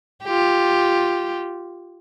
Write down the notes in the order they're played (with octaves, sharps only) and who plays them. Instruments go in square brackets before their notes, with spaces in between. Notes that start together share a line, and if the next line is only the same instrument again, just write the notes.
[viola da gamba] F4 G4